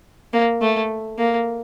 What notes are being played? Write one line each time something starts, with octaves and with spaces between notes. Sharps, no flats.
A#3
A3
A#3